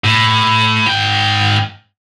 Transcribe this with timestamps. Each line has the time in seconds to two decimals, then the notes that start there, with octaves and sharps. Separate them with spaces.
0.04 A2
0.87 G#2 G5